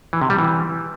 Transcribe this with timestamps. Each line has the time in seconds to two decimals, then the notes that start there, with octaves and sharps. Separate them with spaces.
0.13 E3
0.21 C3
0.30 G3
0.39 E3